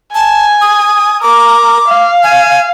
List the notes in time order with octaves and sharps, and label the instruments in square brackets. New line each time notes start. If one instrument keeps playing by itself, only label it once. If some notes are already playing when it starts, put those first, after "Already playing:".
[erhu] G#5 [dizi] A5
[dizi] D#6
[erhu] A#4 [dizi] D6
[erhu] F5
[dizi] G#5